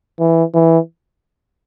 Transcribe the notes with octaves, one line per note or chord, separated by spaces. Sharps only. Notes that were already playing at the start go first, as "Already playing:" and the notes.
E3
E3